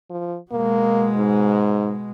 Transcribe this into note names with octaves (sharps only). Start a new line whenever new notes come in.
F3
B2 G#3 A#3
G#2